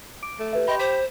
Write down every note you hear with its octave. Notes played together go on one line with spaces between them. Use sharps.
D6 D7
A3
G4 B4 E5
G4 D#5 B5 C6
C5 B5 D6 B6